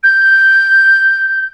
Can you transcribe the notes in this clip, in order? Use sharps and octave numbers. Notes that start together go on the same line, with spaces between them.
G6